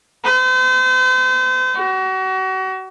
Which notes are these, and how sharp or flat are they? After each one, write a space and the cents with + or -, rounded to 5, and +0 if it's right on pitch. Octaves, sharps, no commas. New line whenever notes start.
C5 -40
F#4 +35